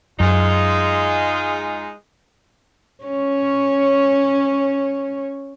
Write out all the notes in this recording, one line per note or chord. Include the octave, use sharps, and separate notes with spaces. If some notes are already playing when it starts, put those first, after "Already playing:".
F#2 G#3 D#4 F4
C#4 C#5